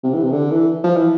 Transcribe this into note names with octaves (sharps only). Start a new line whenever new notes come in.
C3
E3
C3
D3
E3
F3
E3